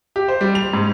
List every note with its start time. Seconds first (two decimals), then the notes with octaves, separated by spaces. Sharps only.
0.16 G4
0.28 C5
0.41 G3
0.55 F7
0.73 G#2